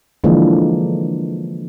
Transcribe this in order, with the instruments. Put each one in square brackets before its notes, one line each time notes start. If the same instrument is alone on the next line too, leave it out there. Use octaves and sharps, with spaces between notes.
[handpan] D3 E3 F3 G#3 A#3 D4